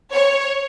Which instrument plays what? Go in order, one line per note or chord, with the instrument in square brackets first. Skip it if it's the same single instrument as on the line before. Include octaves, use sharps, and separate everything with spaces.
[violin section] C#5